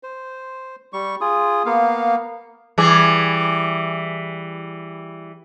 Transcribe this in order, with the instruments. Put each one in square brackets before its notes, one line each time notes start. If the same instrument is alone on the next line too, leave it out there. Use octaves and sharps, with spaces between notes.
[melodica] C5
G3 C#6
F4 G#4 D#6
A#3 B3 F5
[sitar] E3 G3 G#4